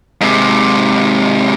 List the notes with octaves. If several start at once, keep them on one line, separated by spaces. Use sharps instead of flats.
G#2 C3